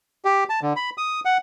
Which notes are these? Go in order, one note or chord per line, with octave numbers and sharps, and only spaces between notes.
G4
A5
D3
B5
D#6
F#5